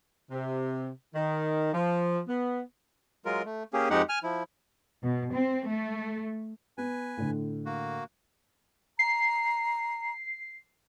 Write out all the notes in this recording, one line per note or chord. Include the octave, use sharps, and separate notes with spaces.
C3
D#3
F3
B3
F#3 G#3 F4 A#4
A3
A#3 C#4 G4 G#4
F2 G#3 D#4 G4 F#5
G#5 F6
F3 E4
B2
C4
A3
B3 B4 G#5
A2 D3
A#3 F#4
A#5 C7